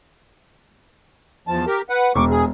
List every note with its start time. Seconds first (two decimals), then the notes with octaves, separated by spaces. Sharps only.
1.48 E2 F3 A5
1.67 G4 A#4
1.89 B4 F#5
2.15 E1 C#6 D6
2.30 G#4